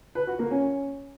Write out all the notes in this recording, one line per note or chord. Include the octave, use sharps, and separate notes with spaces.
B4
F#4
A#3
C#4